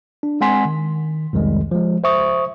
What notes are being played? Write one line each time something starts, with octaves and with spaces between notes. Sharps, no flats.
D4
G#3 C4 F#5 G#5 C6 B6
D#3
C2 F2 D#3 G3 G#3
F3 G#3
C5 E5 C#6 D#6